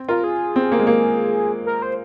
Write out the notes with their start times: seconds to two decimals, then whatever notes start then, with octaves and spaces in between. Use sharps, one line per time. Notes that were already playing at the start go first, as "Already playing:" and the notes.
Already playing: C4
0.09 F4 A#4
0.24 G#4
0.56 C4
0.72 A#3
0.80 G#3
0.87 A#3
1.66 A#4
1.82 C5